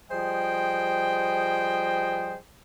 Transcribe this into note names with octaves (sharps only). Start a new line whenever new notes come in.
F3 G3 G#4 C5 D#5 G5